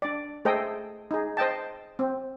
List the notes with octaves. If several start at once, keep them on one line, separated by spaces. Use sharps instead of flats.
D4 D5
A3 G#4 A4 C5 D#5 G5
D#4 G#4
C5 D#5 G5 A5
C4